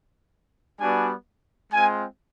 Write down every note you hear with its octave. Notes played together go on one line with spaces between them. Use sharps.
G3 B3 D4 F#4 G#5
G#3 C4 F4 G#5